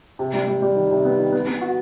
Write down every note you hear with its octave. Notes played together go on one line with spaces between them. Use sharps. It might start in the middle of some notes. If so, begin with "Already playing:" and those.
C3
G3
G3
G3
D#3
C3
B3
D#3
B3
B3
F#4